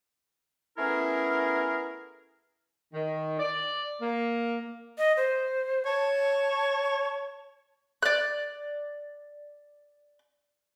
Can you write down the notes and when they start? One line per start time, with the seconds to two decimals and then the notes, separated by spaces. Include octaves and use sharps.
0.78 A3 B3 C#4 E4 G#4 A#4
2.94 D#3
3.39 D5
4.01 A#3
4.98 D#5
5.17 C5
5.86 C#5 A5
8.03 D5 F#6